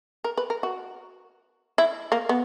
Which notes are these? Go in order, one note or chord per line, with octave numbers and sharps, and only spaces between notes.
A#4
B4
A#4
F#4
E4
A#3
B3